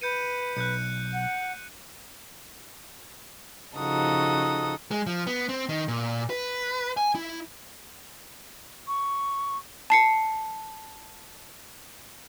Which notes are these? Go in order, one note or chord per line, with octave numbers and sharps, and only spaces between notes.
B4 G6 C#7 D#7
B1 F#6 G6 C#7
F#5
C#3 F3 D#4 F#4 A4 D#6
G#3
F3
B3
C4
D#3
A#2
B4
G#5
E4
C#6
A5 C7 C#7